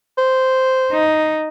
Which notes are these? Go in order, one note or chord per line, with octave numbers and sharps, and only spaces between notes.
C5
D#4